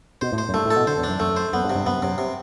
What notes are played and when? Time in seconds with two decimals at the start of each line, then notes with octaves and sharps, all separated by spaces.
0.21 B2 C5
0.32 A2
0.38 C5
0.49 F#2
0.54 G2 A3
0.65 A2
0.71 A4
0.76 B2
0.87 D3 C5
0.98 E2
1.04 D4
1.09 F#2
1.20 F#2 A3
1.36 C5
1.53 F#2 B3
1.64 G2
1.70 C3
1.75 G2
1.86 F#2 B3
2.02 F#2 C3
2.18 C3